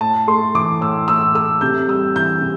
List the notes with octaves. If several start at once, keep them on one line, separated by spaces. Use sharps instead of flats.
A2 A5
A3 C6
E3 D6
A2 E6
A2 E6
A3 E6
C3 G6
G3 E6
E3 G6
C3